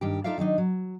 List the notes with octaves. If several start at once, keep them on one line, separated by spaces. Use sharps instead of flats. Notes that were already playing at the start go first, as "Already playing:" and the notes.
G2 D#3 G4
D#4 F4 A4 D5 E5 F5
D#3 F#3 D4 D#4
F#3